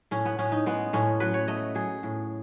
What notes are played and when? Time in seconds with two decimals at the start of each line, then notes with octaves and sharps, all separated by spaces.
0.11 A2 C#4
0.25 B3
0.39 A2 C#4
0.52 D#4
0.66 G#3 B3
0.93 A2 C#4
1.20 F#3 B4
1.34 C#5
1.48 A3 D#5
1.75 F#3 G#4
2.03 A2